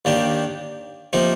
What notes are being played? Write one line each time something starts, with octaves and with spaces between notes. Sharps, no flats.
D#2 D#3 A#3 D4 G4
C3 F3 A#3 D#4